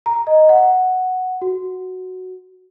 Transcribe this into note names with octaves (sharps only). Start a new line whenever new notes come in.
A#5
D#5
F#5
F#4